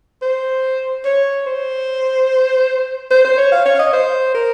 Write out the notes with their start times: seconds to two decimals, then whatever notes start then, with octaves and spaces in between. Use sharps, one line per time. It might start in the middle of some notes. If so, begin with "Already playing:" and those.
0.22 C5
1.05 C#5
1.46 C5
3.11 C5
3.24 C5
3.38 C#5
3.52 F5
3.65 C#5
3.75 F5
3.79 D#5
3.93 C5
4.35 A#4